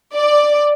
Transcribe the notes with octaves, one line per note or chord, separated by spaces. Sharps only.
D5